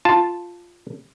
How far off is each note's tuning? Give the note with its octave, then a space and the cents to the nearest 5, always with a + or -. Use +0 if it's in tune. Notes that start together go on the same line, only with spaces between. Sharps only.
F4 +0 A5 +0